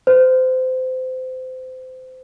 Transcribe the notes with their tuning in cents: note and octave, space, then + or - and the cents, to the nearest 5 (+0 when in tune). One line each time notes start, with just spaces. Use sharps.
C5 -25